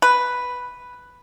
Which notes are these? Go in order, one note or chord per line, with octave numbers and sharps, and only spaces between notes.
B4